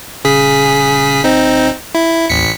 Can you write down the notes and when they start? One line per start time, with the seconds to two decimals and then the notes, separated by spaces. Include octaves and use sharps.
0.24 D#1 C#3 G#4 B6
1.24 C4 D#4
1.95 E4
2.29 A1 D#2 B6 C#7